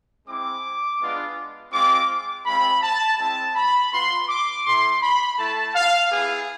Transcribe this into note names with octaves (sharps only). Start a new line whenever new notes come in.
G#3 C4 E4 D6
G#3 B3 D4 F4
G#3 C4 F4 D6
G#3 C4 F4 B5
A5
G#3 C4 E4 A5
B5
B3 F4 C6
D6
A3 E4 C6
B5
A3 E4 A5
F5
B3 E4 G#4